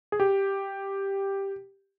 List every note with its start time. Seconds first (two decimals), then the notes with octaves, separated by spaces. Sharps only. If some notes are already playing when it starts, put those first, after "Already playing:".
0.12 G#4
0.20 G4